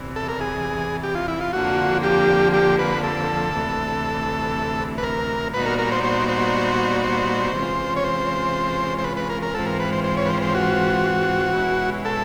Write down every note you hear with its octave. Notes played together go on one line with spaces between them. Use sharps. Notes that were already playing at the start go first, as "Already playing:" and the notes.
Already playing: E2 C3 E3
A4
A#4
G#4
G4
F4
E4
F4
F2 D3 F3 A#3 D4 F#4
G4
G4
B4
A4
D2 C3 E3
B4
A#4
A#2 G3 B3 D#4 F#4 B4
A#4
A#4
C5
C5
C5
C5
C3 E3 G#3 C#4 F4
C#5
C5
C5
B4
B4
A#4
A#4
G#2 E3 G#3 C4 F4 A4
A#4
B4
C5
C5
C#5
B4
C5
C5
F#4
B2 G#3 C#4 E4
A4